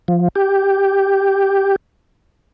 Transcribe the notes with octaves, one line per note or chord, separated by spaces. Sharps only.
F3
G4